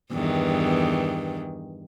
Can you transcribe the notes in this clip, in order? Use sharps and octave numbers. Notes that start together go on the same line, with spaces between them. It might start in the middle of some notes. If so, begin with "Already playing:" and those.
E2 G2 D#3